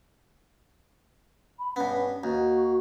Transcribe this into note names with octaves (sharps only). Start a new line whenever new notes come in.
B5
G2 B3 C#4
D#2 F#4